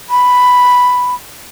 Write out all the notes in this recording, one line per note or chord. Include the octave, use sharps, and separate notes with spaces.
B5